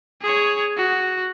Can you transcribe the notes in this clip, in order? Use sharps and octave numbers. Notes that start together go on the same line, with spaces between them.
G#4 C#5
F#4